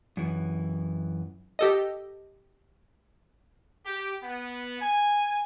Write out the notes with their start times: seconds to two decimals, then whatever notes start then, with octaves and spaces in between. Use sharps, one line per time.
0.17 F#2 E3
1.59 G4 A4 D#5
3.85 G4
4.23 B3
4.80 G#5